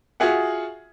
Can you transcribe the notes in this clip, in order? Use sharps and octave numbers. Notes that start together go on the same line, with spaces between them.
F4 F#4 G#4 E5 F#5